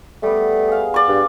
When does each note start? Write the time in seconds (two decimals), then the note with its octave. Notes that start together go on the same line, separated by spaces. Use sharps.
0.23 G3 A3 B3
0.68 G#4 F5
0.94 D5 C#6
1.08 G2